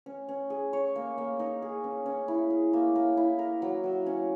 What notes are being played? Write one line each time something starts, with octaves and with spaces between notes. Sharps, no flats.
C#4
C#4
G#4
C#5
A#3
A#3
D#4
G#4
C#4
C#4
E4
G#4
A#3
A#3
E4
A#4
F#3
F#3
C#4